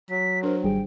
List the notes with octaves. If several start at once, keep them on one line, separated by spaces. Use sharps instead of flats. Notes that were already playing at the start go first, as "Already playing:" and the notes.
F#3 B6
D4 A#4 C5
G#1 G3 G#4 G5